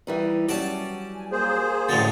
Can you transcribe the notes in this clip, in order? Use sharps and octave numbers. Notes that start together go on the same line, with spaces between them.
E3 G3 D#4
F#3 G3 C#4 D5 A5
G#5
A#3 G#4 C5 G6
A2 D3 F#3 C#4 A6